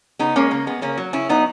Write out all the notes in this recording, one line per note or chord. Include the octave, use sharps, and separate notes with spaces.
C#3 B3 D#4
G#3 A#3 C#4
C#3 A#3
G#3 B3
C#3 A#3 C#4
F#3
C#3 C#4 E4
F#3 B3 D#4